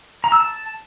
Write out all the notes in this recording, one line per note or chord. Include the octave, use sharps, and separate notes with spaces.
A#5
E6
A5